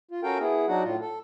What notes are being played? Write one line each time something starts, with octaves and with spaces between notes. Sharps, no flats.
F4
C#4 F#4 A4 A#4 F5 G5
B3 E4 G#4
F#3 D4 D#4 F#4 F#5
A2 F4
A4